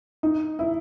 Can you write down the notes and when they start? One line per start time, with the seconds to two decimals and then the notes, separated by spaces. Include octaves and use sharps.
0.23 D#4
0.59 E4